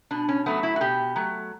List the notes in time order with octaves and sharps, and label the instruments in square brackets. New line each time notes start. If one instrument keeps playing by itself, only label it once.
[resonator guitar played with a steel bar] B2 D4
C#4
F#3 A3 B3
E4
F#4
B2 G4
F#3 A3